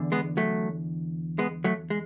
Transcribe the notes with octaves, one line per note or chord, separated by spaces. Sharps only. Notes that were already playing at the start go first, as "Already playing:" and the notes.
Already playing: E2 D3
G#3 B3
F#3 A3
G#3 B3
F#3 A3
G#3